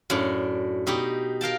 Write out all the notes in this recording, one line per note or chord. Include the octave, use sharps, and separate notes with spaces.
F#2 A2 D4
B2 D#4 G4
A#4 F5 G5 A5